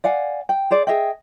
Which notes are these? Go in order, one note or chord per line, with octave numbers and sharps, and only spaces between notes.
D5 F5 F#5 G#5
G5
G#4 C5 D5
G#4 D#5 E5 G5